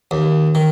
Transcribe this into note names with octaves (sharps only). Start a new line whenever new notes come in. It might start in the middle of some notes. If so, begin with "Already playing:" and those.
D#2
D#3